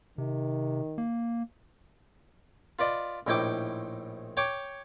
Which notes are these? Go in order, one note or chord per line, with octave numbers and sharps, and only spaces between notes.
C3 D#3
A#3
F4 B4 D5 D#5
A#1 A2 D#4 E4 G5 D6
C#5 G5 D6